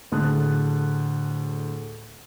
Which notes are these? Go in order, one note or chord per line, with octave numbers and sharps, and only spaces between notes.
D2 A2 G#4 A5 D#6 F#6